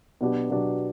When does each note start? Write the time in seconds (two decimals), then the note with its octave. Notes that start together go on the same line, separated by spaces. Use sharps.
0.21 B2 F#3 B3 D4 G4
0.50 B2 F#3 B3 D4 G4